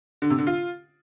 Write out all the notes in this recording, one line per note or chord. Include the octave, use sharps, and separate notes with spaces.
D3
C3
D3
F4